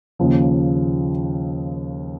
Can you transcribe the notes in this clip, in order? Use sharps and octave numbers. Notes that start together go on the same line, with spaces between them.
D#2 C#3 F3